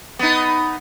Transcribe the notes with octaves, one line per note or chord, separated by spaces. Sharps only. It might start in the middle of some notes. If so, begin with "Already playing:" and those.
B3 D#4